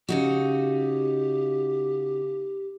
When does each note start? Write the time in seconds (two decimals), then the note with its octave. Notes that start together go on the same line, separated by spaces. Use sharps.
0.09 C#3 D#4 F#4 G4